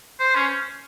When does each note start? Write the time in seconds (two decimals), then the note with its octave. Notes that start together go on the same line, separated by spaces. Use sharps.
0.20 C5
0.36 C#4